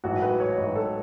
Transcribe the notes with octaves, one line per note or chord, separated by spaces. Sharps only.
A1 G#2 F#3 F#4
B4
C#5
A1 G#2 F#3
A4